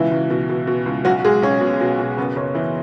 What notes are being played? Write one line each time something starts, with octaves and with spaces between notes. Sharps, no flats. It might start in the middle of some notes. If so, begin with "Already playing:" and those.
Already playing: C#2 B2 E3 E4
C#2
B2
B2
B2
C#2
B1 F#3 F#4
F#4
B1 G#3 G#4
B1 C#4 C#5
B2
B2
B2
F#1 B3
F#1 C#4
E3 E4